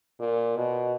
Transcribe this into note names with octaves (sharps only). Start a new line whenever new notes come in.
A#2
B2